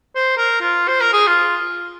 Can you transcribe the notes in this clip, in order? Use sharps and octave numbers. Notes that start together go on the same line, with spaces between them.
C5
A#4
F4
C5
A#4
G#4
F4